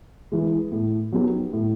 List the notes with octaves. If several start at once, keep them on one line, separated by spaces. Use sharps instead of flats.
E3 G#3
A2
F#3 B3 D#4 G4
A2